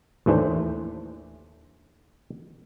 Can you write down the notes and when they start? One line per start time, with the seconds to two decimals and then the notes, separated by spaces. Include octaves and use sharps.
0.26 D#2 A2 E3 D4 C5